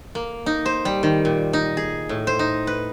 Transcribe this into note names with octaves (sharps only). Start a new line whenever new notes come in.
A#3
D#4
C5
G3
D#3
A#2
D#4
G#4
A2
C5
D#4
B4